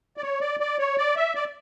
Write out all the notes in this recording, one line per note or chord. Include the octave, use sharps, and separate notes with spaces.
D5
C#5
D5
D5
C#5
D5
E5
D5